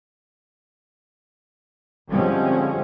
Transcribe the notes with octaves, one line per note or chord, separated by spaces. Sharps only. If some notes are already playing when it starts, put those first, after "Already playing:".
D3 F3 G3 G#3 C4 C#4